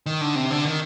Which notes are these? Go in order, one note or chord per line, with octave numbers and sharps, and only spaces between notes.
D#3
D3
C3
D3
D#3